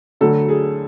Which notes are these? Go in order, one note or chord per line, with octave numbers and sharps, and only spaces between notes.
D2 D3 F#3 A3 A4
G#4